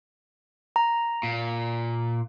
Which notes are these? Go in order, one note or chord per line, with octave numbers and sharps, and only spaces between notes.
A#5
A#2